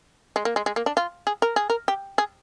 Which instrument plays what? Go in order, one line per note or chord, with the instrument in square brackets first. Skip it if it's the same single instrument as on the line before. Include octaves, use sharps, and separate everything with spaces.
[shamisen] G#3
A#3
G#3
G#3
A#3
D4
F4
G#4
A#4
G#4
A#4
G4
G#4